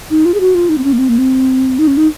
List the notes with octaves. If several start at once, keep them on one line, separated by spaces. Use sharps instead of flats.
D#4
F4
G#4
F#4
F4
D#4
C4
C#4
A#3
C4
A#3
C4
D#4
C#4
D#4